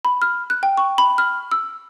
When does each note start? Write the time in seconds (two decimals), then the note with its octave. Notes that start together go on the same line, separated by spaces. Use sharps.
0.05 B5
0.22 F6
0.50 F#6
0.63 G5
0.77 C#6
0.98 B5
1.18 F6
1.51 E6